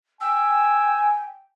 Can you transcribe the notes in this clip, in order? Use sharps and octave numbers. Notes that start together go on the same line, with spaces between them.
G5 G#5 E6